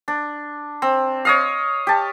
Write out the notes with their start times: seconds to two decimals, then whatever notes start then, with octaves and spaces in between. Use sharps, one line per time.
0.08 D4
0.82 C4
1.25 C#5 D#5 F5
1.87 G4 A5